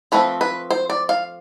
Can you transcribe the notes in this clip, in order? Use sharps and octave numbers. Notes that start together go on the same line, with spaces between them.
F3 A3 C4 B4
B4
C5
D5
F5